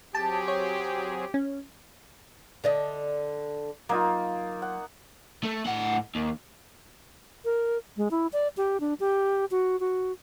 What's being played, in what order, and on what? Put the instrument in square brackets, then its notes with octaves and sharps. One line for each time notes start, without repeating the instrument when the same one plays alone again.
[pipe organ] F#3 C4 G#4 [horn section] G4 [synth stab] A5
[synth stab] C#5
C#4
[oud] D3 D5 D#5
[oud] F#3 [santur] A#3 D#4 F4
[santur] F#5
[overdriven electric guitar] A3
A2 F#5
D#2
[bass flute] A#4
G#3
E4
D5
G4
D4
G4
F#4
F#4